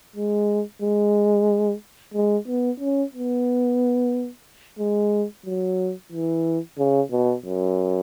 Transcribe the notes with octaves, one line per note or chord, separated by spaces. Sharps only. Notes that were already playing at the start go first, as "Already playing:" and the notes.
G#3
G#3
G#3
B3
C#4
B3
G#3
F#3
E3
C#3
B2
F#2